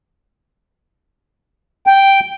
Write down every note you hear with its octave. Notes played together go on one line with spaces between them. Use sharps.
G5